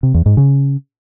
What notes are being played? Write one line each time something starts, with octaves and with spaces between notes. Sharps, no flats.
C3
E2
G#2
C#3